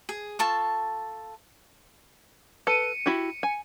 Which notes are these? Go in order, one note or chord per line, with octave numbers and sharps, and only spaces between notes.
G#4
F4 A4 A5 C#6
A4 B4 C#7 D#7
E4 F#4 G4
G#5